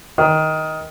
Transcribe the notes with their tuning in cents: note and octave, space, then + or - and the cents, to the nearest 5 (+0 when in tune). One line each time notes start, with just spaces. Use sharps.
D#3 +10